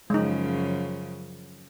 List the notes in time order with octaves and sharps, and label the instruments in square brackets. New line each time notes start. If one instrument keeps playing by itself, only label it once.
[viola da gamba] F#2 C#3 F3 [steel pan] G#3 D#4